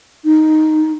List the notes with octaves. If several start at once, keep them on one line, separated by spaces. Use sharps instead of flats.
D#4